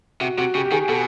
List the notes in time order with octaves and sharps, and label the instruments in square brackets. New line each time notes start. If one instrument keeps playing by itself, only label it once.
[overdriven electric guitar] C3 [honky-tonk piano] F#4
[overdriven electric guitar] C3 [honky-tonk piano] F#4
[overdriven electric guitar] C#3 [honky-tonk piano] G4
[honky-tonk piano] G4
[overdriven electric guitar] D#3 [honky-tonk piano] G#4
[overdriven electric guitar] B2 [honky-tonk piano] A4